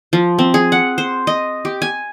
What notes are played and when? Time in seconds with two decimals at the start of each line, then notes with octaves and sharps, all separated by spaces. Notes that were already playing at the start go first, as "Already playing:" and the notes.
0.13 F3
0.39 C4
0.54 G#4
0.72 F#5
0.98 C5
1.27 D#5
1.65 G4
1.82 G#5